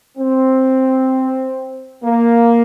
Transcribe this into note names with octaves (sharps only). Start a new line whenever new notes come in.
C4
A#3